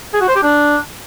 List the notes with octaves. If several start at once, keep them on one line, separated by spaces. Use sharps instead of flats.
G#4
F#4
C5
G4
D4